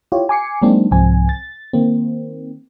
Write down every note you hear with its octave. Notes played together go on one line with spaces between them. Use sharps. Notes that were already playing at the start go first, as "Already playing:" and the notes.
E4 F4 G4 C#5
G#5 D6 C7 C#7
F#3 G#3 A#3 C4 D4 D#4
C2 G#2 F3 C4 G#5
A6
D#3 A#3 C4